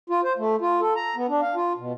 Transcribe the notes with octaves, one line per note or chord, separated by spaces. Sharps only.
F4
C5
A3
F4
A4
A#5
B3
D4
F5
F4
B2